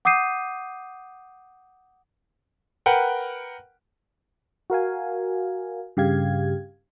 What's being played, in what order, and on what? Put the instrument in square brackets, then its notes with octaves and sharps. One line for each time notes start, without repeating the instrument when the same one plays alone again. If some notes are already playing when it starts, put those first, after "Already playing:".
[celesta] F#5 D6 D#6 G6 C7 D#7
[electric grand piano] A#4 B4 F#5 G5
[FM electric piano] F#4 A#4 F5 G#5
G2 C#3 G4 F5 G#6